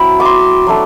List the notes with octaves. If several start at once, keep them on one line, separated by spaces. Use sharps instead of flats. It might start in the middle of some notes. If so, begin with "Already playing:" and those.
Already playing: F#3 C4 E4 B5
D6
C6
F#3 A3 D4